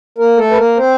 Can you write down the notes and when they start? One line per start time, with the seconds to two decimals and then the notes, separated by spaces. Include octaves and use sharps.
0.18 A#3 A#4
0.38 A3 A4
0.51 B4
0.57 A#3 A#4
0.77 C4 C5